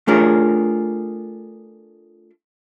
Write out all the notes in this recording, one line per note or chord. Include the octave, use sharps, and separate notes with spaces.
A3 D4 F4 G#4 A#4 C#5